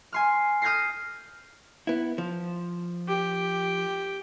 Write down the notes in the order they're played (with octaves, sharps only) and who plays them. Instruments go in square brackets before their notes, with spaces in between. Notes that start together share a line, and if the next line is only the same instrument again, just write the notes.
[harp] G#5 C6 F6
D#6 F6 G6 G#6 A#6 C7
[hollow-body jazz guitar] B3 E4
F3
[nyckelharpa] G4